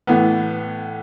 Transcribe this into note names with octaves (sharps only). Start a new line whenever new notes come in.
A2 E3 B3